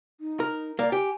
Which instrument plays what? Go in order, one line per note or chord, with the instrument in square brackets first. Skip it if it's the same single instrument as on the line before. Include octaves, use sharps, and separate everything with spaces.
[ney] D#4
[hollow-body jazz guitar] A#4
[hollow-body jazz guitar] A#3 [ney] D5
[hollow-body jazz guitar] G4 [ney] G#5